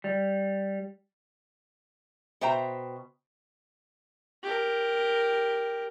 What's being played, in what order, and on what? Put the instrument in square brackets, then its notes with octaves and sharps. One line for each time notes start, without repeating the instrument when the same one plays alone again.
[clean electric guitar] G3
[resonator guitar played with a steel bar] B2 C5 E5 G5 A#5
[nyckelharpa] G4 A#4